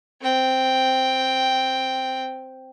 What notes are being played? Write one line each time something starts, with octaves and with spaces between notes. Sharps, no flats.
C4 G5